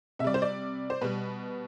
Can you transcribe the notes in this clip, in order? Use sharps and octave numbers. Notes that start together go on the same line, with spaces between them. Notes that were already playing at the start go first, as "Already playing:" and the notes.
C3 G3 D5 E5
C5
D5
C5
B2 G3 B4